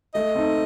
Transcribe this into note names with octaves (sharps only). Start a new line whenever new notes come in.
A3 D#5
C4 D#4 A4